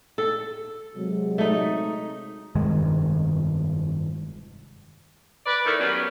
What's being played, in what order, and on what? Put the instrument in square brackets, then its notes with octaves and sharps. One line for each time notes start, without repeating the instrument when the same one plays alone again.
[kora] A4
[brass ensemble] C3 F#3 G#3
[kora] A3 D#4
[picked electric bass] F1 G2 D#3 G#3
[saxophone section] B4 D5
D#3 A3 E4 A#4
F#3 G3 B3 C#4